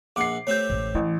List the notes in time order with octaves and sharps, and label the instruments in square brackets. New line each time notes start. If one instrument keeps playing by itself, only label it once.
[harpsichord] A#1 F#5 [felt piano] D6 C7
[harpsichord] A3 C4 G4 [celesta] C#5 G6
[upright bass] A1
[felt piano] A1 [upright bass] E3